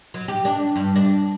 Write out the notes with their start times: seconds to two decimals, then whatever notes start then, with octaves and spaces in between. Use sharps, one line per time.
0.14 F#3
0.28 G4
0.45 D4
0.76 G2
0.96 D4